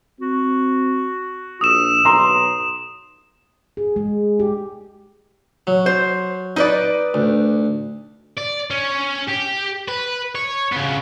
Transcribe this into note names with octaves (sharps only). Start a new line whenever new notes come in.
C4 F#4
A#1 D#6 E6 E7
B1 A#5 C6
G#4
G#3
G4
F#3
C5
D#4 B4 D5
D2
D5
C#4
G4
B4
C#5
C#3 B3